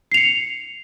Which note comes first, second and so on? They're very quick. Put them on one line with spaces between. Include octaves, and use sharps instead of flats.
C7 F7 C#7